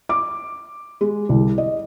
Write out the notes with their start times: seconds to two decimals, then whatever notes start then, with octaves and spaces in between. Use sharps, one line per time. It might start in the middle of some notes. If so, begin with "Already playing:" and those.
0.09 D6
1.01 G#3
1.29 C2
1.58 D#5